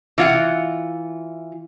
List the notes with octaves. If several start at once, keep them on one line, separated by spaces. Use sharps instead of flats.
E3 F4 F#5